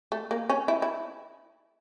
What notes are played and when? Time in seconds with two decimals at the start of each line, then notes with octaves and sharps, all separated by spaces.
0.12 A3
0.31 A#3
0.50 C#4
0.68 E4
0.82 E4